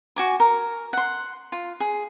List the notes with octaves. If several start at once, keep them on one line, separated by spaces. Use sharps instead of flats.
F#4 G#5 D6
A#4
F#5 C6
F4
G#4